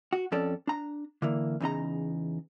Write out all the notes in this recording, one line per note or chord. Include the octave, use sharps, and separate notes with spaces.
F#4
F2 C#4 A4 D5
D4 A#5
D3 E3 A#3
E2 C#3 D#4 A#5